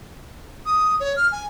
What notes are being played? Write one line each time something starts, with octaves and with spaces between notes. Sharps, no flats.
D#6
C#5
F6
G#5